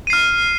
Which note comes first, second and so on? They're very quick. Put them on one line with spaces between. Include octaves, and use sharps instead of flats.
D#7 C7 F6